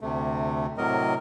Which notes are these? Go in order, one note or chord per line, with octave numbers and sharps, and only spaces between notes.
D2 C3 A3
A2 C3 F#3 A#4 D#5